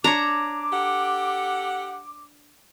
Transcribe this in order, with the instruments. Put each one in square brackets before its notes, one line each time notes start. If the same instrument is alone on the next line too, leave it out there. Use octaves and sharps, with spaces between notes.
[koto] D4 C#5 [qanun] A#5 [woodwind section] D6
[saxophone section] G4 A4 F#5